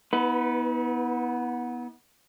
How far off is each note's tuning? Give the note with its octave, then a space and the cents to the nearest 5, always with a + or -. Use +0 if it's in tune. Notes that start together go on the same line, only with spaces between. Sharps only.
B3 -15 E4 -45 B4 +20